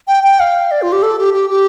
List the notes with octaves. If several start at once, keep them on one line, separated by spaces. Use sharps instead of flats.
G5
G5
F5
D5
F4
G4
A4
G4
G4
G4